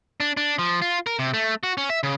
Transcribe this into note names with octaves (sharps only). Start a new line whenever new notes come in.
D4
D4
F3
F4
A#4
C3
A3
F#4
C#4
E5
C#3